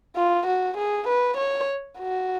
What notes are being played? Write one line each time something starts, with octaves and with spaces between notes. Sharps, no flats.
F4
F#4
G#4
B4
C#5
F#4